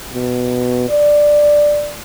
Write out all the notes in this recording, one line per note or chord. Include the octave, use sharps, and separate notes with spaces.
B2
D5